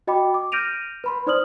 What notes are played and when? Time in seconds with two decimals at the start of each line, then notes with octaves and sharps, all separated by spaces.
0.07 F#4 D#5 G5 B5 D6
0.34 D6
0.52 F6 G6 A#6 D7 D#7 F7
1.04 B4 B5 C6
1.27 D#4 C5 D5 D#6 F6 F#7